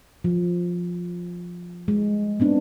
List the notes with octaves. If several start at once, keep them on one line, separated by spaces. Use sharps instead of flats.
F3
G3 G#3
B3 C4 D4 D#4